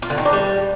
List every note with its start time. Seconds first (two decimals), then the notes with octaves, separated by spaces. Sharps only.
0.02 F4
0.10 D3
0.18 D#3
0.25 D4
0.33 G3